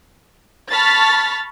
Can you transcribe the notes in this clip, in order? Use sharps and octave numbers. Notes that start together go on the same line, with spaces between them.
A5 B5 C#6 F6 A6 B6